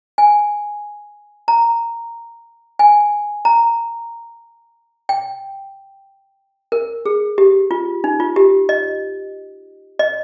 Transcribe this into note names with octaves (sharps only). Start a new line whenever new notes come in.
G#5
A#5
G#5
A#5
G5
A#4
G#4
G4
F4
D#4
F4
G4
D#5
D#5